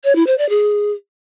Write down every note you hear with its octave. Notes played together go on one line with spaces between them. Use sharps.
C#5
E4
C5
D5
G#4